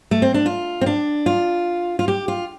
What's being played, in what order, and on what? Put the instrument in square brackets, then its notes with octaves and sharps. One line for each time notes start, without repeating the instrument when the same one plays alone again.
[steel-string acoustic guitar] A3
C4
D4
F4
C4
D4
F4
F4
G4
F4